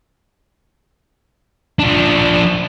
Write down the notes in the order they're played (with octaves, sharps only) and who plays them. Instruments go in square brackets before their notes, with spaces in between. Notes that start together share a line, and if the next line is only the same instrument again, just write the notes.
[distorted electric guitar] F3 D4